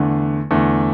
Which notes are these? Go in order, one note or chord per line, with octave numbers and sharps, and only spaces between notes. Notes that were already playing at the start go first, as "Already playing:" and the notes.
Already playing: E2 D3 A3
E2 D3 A3